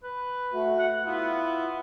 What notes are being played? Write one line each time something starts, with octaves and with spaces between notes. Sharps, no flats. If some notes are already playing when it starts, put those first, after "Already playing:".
B4
A3 F#4
F#5
B3 E4 F4 E5